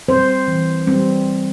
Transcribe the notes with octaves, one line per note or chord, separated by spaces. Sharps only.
G3 C4 C5
E3
G3 C4